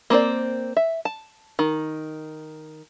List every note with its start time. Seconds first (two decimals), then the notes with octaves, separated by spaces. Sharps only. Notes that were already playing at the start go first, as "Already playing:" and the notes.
0.10 A#3 C4 C5 D5
0.77 E5
1.05 A5
1.59 D#3